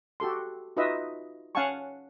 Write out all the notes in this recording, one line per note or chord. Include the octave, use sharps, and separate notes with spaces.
F#4 G4 A4 C6
D#4 F4 F#4 B4 D#5 E5
C#4 F5 F#5 G#5 A5 C#6